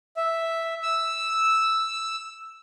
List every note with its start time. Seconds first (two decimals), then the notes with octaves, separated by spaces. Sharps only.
0.17 E5
0.82 E6